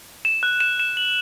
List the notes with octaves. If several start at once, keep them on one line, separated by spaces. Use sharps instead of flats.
E7
F#6
E7
E7
F#7